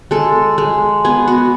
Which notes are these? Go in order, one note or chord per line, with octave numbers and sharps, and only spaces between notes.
G#3 A4
G#3
B3 G#4
F#4